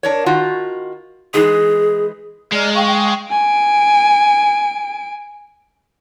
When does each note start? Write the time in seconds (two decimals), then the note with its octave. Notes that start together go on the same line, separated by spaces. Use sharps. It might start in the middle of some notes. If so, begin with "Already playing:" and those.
0.03 D4 A#4 C#5
0.26 D#3 F4 F#4
1.34 E3 G#3 D#4 G#4
2.52 G#3 D5 A#5 F6
2.74 F5 G5 C#6
3.31 G#5 D7